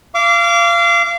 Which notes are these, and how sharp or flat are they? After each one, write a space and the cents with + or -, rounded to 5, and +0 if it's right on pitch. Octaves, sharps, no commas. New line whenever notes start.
F5 -30 D6 -25